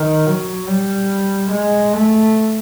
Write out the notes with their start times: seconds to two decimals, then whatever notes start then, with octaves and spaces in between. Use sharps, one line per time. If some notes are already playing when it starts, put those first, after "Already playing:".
Already playing: D#3
0.26 F#3
0.68 G3
1.51 G#3
1.93 A3